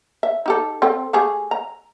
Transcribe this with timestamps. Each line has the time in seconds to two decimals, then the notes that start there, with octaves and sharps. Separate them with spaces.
0.23 E5
0.46 D#4 G4 A4
0.82 C4 A4 G5
1.13 A3 G4 G#4
1.51 A#5